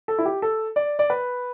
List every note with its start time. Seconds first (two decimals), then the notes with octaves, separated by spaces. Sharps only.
0.08 A4
0.18 E4
0.25 G4
0.42 A4
0.76 D5
0.99 D5
1.10 B4